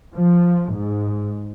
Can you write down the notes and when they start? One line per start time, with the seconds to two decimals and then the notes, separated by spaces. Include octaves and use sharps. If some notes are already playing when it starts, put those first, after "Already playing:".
0.15 F3
0.74 G#2